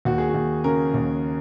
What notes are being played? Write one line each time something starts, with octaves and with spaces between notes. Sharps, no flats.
D#2 F#4
G#4
F#4
D#2
C#3 A#4
D#2